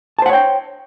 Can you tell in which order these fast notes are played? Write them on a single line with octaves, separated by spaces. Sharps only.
A5 C5 F#5 C#5 G5